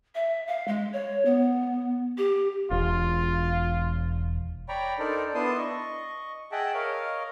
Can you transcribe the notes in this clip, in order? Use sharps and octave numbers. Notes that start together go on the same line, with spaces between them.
E5
F5
G#3
C#5
B3
G4
E1 F4
C#5 D5 G5 A#5 B5 C#6
D4 D#4 A4 A#4 C5 D5
B3 D4 E4 A5 C6 D#6
D#5 C#6
G#4 D#5 E5 F#5 G5 A5
A#4 C#5 D#5 F5